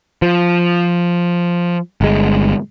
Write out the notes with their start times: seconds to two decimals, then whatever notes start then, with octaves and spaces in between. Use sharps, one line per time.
0.22 F3
2.01 G1 G#3